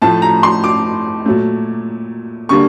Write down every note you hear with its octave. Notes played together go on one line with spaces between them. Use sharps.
A2 F3 A3 A5
A#5
C6
D6
A#2 F#3 A3
D3 G3 A#3 C#6